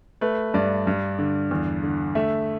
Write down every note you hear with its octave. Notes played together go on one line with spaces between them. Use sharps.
A3 B4
G2 D5
G2
D3
E2
D3
A3 E5